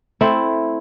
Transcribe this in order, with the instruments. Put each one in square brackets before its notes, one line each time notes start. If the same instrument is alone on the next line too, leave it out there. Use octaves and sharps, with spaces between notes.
[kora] A3 C4 E4